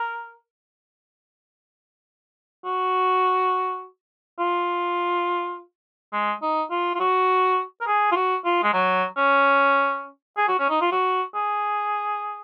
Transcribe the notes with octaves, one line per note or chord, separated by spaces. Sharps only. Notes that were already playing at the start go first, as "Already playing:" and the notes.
Already playing: A#4
F#4
F4
G#3
D#4
F4
F4
F#4
A#4
G#4
F4
F#4
F4
G#3
F#3
C#4
G#4
F#4
C#4
D#4
F4
F#4
G#4